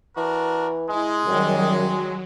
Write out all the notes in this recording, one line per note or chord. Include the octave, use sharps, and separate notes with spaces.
E3 D4 F#4 A#4
G#3 E4
F#2 D#3 F#3 G3